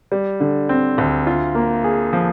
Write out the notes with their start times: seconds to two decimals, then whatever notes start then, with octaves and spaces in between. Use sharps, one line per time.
0.12 G3
0.40 D3
0.69 C4
0.98 D2
1.27 F4
1.55 A#3
1.84 G#4
2.13 F3